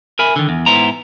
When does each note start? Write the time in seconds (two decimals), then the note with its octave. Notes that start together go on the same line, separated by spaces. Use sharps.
0.19 A#4 E5 G#5 B5
0.36 D3 D#3
0.49 E2
0.66 G#2 B3 E4 C5 A#5